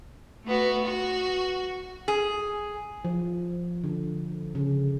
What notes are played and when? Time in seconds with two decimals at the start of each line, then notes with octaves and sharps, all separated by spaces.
0.44 A3 B3 F#4
0.84 F#4
2.08 G#4
3.05 F3
3.84 D3
4.55 C#3